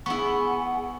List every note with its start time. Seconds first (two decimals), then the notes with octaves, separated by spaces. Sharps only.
0.06 B3 E4 G#4 F#5 G#5 C#6